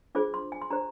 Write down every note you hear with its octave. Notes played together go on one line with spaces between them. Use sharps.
D4 F4 G#4 C5 D6
C6
G#5
C6
D4 G4 C5 A#5